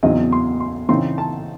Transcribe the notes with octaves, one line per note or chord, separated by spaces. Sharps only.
E2 C#3 F#3 C4 D#4 D#5
C6
C6
C#3 E3 C4 D#4 C6
A5